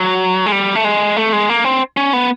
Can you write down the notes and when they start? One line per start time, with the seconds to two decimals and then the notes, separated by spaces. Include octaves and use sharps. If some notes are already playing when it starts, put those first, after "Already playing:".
Already playing: F#3
0.46 G#3
0.52 G3
0.75 A3
0.85 G#3
1.17 A3
1.33 G#3
1.49 A#3
1.64 C4
1.97 C#4
2.13 B3